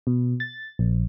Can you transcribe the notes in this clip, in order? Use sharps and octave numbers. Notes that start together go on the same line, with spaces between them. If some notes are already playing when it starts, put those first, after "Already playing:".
B2
A6
A#1